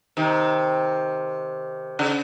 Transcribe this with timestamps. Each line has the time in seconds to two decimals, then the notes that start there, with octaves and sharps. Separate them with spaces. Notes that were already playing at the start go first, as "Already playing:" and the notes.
0.17 C3 D#3
1.99 C#3